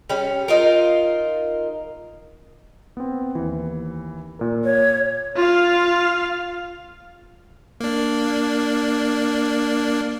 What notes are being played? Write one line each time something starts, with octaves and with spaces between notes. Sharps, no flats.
G3 C#4
D#4 F4 A#4
B3 C4
D#2 E3
A#2 A#4
C#5
F4 F5
A#3 D4